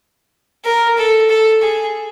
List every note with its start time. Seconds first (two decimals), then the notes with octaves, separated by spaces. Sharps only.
0.65 A#4
0.97 A4
1.29 A4
1.62 G#4